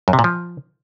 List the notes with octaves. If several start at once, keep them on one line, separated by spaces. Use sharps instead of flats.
F#2
C3
A#2
F3